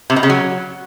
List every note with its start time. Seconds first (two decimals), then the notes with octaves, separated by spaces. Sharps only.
0.10 C3
0.16 B2
0.23 C#3
0.30 F#3